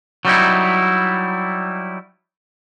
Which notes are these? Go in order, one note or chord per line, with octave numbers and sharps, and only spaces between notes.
F#3 G3 D#4 E4